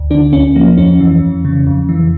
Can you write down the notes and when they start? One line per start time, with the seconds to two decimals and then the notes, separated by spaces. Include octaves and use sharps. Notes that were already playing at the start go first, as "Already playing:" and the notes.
Already playing: D2
0.11 D3 D4
0.33 D2 C#4
0.56 F3 A#3
0.78 F2 C#4
1.00 E3
1.22 F2
1.45 C#3
1.67 F2
1.89 E3